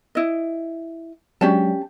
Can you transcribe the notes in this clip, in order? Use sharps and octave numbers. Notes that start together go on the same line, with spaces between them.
E4 D#5
F#3 G#3 C#4 D4 G4 A5